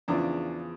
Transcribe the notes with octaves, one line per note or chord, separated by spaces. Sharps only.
E2 C#3 F3 D4